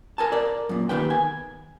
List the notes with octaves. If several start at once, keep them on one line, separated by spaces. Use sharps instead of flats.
A#4 G#5 A5
A#4 D5
F#2 A#2
D#2 D#3 B3 G5
G#5